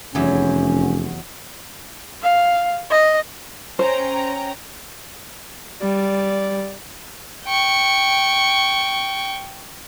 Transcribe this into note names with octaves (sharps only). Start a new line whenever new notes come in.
F1 E2 F#3 C#4
F5
D#5
C#4 C5 G5 A#5
G3 D5
G5 C#6